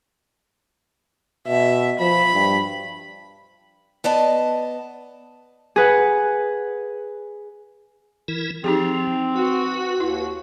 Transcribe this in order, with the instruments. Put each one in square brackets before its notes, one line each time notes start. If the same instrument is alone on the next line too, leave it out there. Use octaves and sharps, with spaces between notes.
[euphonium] B2 [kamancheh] E5
[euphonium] F3 [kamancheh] B5
[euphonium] G2
[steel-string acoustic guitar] B3 D5 D#5 A5
[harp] G#4 B4 F#5
[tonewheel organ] E3 E4 A#4
[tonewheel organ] F3 [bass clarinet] C4 [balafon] D#4 G4 G#4
[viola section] F#4 [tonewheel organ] B4
[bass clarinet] D#2 [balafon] E4